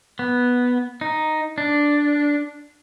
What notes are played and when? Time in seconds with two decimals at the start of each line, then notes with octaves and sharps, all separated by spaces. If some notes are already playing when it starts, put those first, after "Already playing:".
0.19 B3
1.01 D#4
1.58 D4